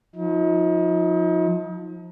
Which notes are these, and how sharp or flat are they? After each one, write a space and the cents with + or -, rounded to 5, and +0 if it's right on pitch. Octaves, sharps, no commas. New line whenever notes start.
F3 +25 D#4 +40